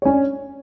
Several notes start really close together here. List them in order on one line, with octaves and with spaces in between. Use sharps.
C#5 C#4 D4